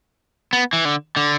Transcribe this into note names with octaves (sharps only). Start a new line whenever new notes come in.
B3
E3
D3
D3